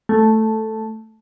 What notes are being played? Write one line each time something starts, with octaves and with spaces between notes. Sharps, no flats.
A3